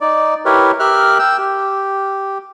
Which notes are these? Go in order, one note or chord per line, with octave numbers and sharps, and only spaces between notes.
D#4 D5
E4 G4 A#4 B4 C#5
G4 A#4 E5 F6 F#6
G5 E6
G4